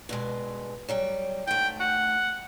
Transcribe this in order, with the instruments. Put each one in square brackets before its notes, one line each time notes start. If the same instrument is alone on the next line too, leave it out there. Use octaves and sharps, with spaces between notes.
[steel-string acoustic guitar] G2 B2 G#3
F#3 G3 G5
[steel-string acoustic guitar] G#2 A3 [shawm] G5
[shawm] F#5